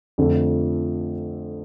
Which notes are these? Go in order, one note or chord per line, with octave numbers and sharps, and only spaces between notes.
F2 D3 F3 A3